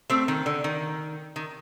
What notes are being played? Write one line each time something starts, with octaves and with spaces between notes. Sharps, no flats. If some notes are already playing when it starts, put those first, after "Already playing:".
A3 C4
D#3
D3
D#3
D#3